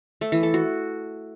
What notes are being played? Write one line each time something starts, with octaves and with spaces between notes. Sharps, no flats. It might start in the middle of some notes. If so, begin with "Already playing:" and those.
A3
E3
A4
F#4